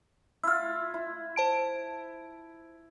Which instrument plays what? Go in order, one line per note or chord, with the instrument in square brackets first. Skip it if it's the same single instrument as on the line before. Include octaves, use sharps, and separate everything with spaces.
[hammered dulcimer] E4 F4 [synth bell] E6 F6
[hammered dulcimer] E4
[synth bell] C5 A5 D7